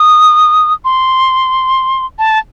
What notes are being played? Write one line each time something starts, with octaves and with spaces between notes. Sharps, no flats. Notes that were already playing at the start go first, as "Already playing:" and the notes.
Already playing: D#6
C6
A5